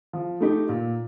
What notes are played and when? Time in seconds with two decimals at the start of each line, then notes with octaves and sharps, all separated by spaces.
0.13 F3
0.40 A3 D#4 G4
0.69 A#2